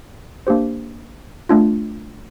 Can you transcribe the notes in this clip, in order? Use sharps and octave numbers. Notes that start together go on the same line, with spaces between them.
A#3 D4 G4 C5
A3 D4 F4